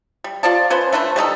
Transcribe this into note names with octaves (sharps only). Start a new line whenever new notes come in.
G3
F4 C5 D5 A5
C#4 B4 C5
A3 D4 B4 C5
G3 A3 D#4 A4